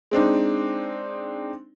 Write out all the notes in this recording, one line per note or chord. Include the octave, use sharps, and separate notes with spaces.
G#3 C4 D4 D#4